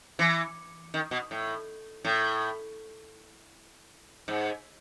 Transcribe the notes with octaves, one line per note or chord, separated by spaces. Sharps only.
E3
D#3
B2
A2
A2
G#2